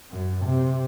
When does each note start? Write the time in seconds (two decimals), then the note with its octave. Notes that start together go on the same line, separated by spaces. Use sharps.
0.11 F#2
0.45 C3